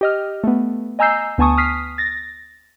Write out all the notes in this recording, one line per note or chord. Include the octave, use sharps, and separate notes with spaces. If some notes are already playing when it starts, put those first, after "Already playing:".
G4 D#5 F6
A3 B3
D#5 G#5 A#5 E6 G6 C7
D2 B3 G#5 A5 C#6 D#6
D#6 F6 B6 C7
A6 A#6